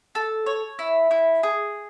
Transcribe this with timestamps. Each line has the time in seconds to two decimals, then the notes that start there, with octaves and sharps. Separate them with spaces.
0.15 A4
0.46 C#5
0.79 E4
1.11 E4
1.43 G#4